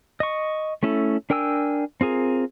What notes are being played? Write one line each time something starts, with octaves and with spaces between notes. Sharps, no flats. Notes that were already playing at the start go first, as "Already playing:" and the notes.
D#5 C#6
A3 C#4 E4 A4
D4 A#4 G5 G#5 E6
C4 F4 G#4 A#4